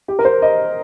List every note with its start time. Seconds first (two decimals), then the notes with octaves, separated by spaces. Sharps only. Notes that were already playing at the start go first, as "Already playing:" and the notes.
0.08 G4
0.19 A#4
0.25 C5
0.42 D#5